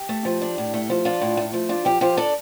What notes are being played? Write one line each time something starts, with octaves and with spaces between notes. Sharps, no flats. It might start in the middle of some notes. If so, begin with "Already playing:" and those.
Already playing: G4
A3
F3
D4
A2
A3
F3
D4 F4 A4
A2
A3
F3
D4 F4
F3 G4
F3 G4 C5
D4 A4 D5